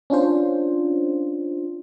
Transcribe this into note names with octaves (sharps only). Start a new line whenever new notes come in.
C#4 D4 F4 C5